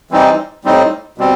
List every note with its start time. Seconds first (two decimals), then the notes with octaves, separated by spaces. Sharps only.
0.11 E3 G3 C4 D#4
0.65 A2 G3 C4 D#4
1.18 B2 G3 C4